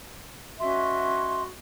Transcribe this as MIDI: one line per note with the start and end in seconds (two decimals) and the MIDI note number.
0.60 1.42 61
0.60 1.47 66
0.60 1.42 75
0.60 1.42 76
0.60 1.43 84